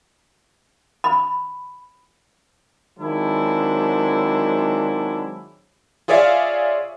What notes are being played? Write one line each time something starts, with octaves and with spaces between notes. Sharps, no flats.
B5
D#3 F#3 G#3 C4 D4 E4
F4 G#4 C#5 D5 E5 F5